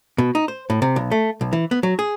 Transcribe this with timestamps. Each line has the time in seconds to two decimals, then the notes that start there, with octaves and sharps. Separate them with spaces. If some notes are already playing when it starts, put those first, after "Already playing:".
0.18 B2
0.35 D#4
0.48 C5
0.70 A2
0.82 C3
0.96 B1
1.11 A3
1.41 B1
1.53 E3
1.71 B3
1.83 F#3
1.99 G#4